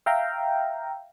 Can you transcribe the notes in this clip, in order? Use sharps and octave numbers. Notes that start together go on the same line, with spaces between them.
E5 F5 G5 A#5